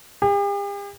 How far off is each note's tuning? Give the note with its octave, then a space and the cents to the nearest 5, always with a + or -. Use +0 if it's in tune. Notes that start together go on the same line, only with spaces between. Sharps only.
G4 +45